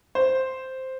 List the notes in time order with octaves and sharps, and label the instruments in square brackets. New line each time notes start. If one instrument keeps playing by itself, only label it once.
[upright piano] C5